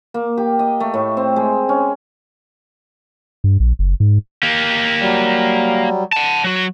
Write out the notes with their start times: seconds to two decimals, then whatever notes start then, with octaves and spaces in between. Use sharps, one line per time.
0.14 A#3
0.38 G4
0.59 D#5
0.80 A3
0.94 A2
1.17 C4
1.36 G#3
1.69 C#4
3.44 G2
3.60 A#1
3.79 F#1
4.00 G#2
4.43 A#3 G4
5.00 F#3 G3
6.13 F#5 A5
6.44 F#3 F#4